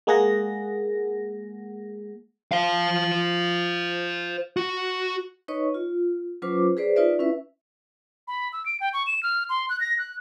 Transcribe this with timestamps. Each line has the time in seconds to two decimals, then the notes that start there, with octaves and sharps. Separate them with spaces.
0.07 G#3 A#3 G#4 F#5 A#6
2.52 C5 F5
4.57 F#4
5.48 D#4 B4 C#5 D#5 C#6
5.74 F4
6.42 F#3 C#4 F4 B4 C5 D6
6.77 G#4 B4 C5 D5
6.96 D#4 F4 B4 D5 E5
7.19 C#4 E4 B4 E5
8.28 B5
8.53 E6
8.66 D7
8.80 G5
8.93 C#6
9.07 E7
9.23 F6
9.49 C6
9.69 F#6
9.80 A#6
9.98 F#6